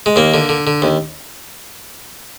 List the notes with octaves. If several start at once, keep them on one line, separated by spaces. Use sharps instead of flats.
G#3
D#2 A#3
D3
D3
D3
D#2